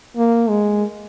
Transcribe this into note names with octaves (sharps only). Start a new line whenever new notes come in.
A#3
G#3